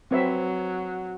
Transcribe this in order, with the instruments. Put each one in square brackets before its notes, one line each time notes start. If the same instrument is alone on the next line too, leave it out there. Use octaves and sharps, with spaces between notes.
[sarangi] F#3 [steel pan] C4 B4 E5